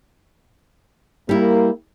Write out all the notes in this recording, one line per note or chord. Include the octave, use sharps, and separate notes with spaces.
G3 A#3 E4